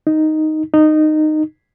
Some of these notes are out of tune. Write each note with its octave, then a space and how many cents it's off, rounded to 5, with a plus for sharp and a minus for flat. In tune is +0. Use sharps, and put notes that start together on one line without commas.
D#4 +0
D#4 -15